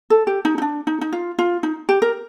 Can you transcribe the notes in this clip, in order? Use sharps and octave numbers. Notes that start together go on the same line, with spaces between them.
A4
G4
D#4
D#4
D4
D#4
D#4
F4
F4
D#4
G4
A#4